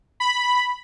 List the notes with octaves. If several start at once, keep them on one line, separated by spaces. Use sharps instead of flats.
B5